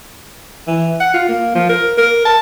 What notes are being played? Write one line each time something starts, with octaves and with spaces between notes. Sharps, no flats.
E3
F#5
F4
A#3
F3
A#4
A#4
A5